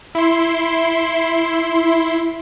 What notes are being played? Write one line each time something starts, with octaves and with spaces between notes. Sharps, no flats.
E4 C6